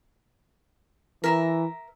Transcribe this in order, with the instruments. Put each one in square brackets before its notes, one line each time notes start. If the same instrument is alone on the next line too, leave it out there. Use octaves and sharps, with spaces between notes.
[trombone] E3 [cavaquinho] A#4 E5 A#5